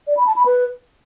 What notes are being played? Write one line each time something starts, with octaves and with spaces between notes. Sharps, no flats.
D5
B5
A5
B5
B4